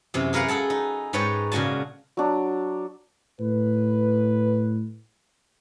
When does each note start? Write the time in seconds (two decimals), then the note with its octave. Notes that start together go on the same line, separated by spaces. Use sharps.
0.14 F#2 C3 E3
0.33 G#4 A#4 B4 F5 F#5
0.48 G#4 A4 F#5 A5
0.70 D#4
1.13 G#2 D#4 B4 C#5 G5 A5
1.52 A#2 C#3 F#4 G#5 A5
2.17 F#3 D4
3.40 A2 B4